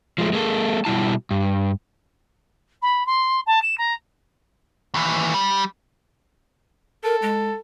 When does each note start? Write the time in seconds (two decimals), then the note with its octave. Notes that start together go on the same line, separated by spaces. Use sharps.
0.18 F3 G#3 A3
0.33 G#3 A#3 A4
0.85 B2 G3 E4 A5
1.31 G2
2.82 B5
3.06 C6
3.46 A5
3.62 E7
3.77 A#5
4.94 D#2 E3
5.34 G3
7.04 A4 A#4
7.22 G#3